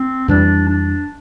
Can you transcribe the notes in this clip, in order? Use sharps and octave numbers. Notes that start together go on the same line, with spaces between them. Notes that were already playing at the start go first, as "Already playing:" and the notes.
Already playing: C4
F2 E3 G3 D4
D4